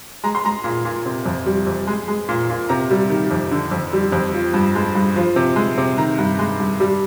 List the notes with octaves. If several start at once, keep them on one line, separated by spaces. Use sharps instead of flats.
G#3 A#5
C6
G#3 A#5
A#2
A#2
C3
F2
G3
F2
G#3
G#3
A#2
A#2
C3 A#5
G3
D#3
F2
D3
F2
G3
F2
F3
G2
G#3
G2
F3
C3
G#3
C3
D#3 A#5
G2
G#3
G2
G3